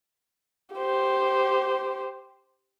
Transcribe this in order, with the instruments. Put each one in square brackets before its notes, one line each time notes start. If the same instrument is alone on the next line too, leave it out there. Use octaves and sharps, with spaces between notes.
[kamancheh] G4 C5